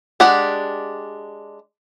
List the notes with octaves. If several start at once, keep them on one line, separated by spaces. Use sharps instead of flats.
G#3 D4 G4 F#5